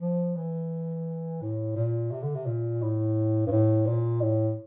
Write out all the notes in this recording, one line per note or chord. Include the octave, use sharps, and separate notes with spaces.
F3
E3
A2
A#2
C3
D3
C3
A#2
A2
G2
A2
A#2
A2